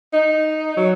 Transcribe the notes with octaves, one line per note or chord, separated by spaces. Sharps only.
D#4
F#3